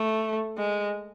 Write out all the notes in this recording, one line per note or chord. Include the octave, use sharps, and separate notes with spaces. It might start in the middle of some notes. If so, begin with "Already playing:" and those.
Already playing: A3
G#3